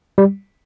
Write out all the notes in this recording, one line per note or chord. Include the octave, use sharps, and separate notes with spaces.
G3